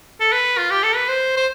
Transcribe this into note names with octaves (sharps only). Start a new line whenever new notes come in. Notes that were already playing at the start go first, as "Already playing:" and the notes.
A4
B4
F4
G4
A4
B4
C5
C5